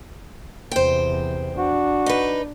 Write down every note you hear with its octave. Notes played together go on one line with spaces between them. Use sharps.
E2 C3 C5 G5
D4 F#4
D#4 B4